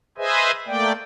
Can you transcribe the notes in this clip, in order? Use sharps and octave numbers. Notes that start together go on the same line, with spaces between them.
G#4 B4 C5 D#5 E5 G#5
A3 A#3 D5 G5